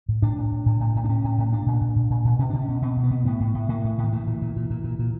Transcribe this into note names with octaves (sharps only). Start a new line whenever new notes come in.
A2
A2 D4
A2
A2
A2
A2
A2
D4
A2 C#4
A2
A2
A#2 D4
A#2
A#2
A#2
A#2
A#2
B2 C#4
B2 D4
C#4
B2
B2 C4
B2
B3
B2
A2 B3
A2
A2
A2 A#3
A2
A2
D#3
A#2 E3
A#2
A#2
A#2
A#2
A#2
A#2